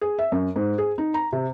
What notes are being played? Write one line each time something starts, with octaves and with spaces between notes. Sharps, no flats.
G#4
E5
F#2
G#2
G#4
D#4
A#5
C3